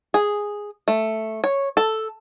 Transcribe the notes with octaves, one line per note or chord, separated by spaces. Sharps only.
G#4
A3
C#5
A4